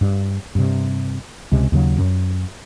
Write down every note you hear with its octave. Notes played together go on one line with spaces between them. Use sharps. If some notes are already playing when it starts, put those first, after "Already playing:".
G2
G2 C3
C#2 C3 G#3
D#2 C#3 F#3
F#2